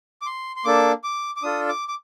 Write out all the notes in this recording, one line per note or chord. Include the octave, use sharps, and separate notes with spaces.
D6
C6
C6
A#3 D4 A4 D6
D6
D6
D4 F4 A4 D#6
D6
D6